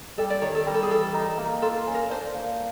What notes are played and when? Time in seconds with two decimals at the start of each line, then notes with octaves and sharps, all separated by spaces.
0.18 G3 A4
0.30 D5
0.42 D#3 C#5
0.55 A4
0.67 G3 A#4
0.74 A4
0.83 G#4
0.90 E3 A4
1.14 D#4
1.38 A#3
1.62 F4 A4
1.87 C#4
1.94 A#4
2.10 D4 C5
2.34 A#3